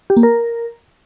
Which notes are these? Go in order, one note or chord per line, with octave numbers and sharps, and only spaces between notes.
G4
A#3
A#4